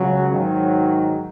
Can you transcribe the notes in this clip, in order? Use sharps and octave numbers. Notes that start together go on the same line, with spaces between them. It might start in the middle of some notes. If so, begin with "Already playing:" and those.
Already playing: C#2 C#3 F#3
G#2 D#3 F#3